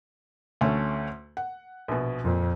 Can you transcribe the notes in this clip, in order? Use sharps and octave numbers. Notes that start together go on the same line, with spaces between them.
D2 A3 C#4
F#5
A#1 B2
F2 A#2